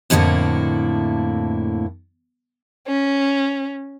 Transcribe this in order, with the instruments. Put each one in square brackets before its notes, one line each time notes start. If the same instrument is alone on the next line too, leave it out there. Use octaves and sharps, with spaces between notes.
[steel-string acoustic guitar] F2 A2 D3 G#3 A#3 E4
[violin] C#4